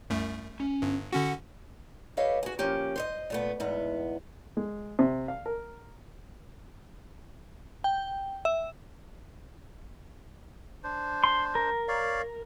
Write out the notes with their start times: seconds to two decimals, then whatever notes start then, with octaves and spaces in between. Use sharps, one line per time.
0.10 C2 F#2 A3
0.60 C#4
0.82 G1 G2
1.13 D3 C#4 F#4 F#5
2.17 G4 A4 B4 C#5 D#5 F5
2.43 F#4 G#4
2.59 F3 A#3 C#4 G4
2.96 C5 C#5 D#5
3.30 A#2 A3 B3
3.60 E2 G#2 B3
4.57 G#3
4.99 C3
5.28 F5
5.46 A#4
7.84 G5
8.45 E5
10.84 D4 C5
11.24 C6
11.55 A#4
11.88 C#5 D5 F5